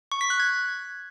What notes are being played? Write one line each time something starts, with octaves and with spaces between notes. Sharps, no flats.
C#6
B6
F#6
G#6